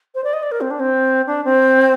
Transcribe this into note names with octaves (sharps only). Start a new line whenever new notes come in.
C5
D5
D#5
D5
A#4
C4
D4
C4
D4
C4